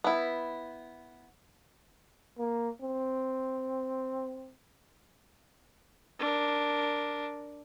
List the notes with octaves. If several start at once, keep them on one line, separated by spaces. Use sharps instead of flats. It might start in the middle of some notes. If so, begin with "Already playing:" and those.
B3 E4
A#3
C4
D4 A#4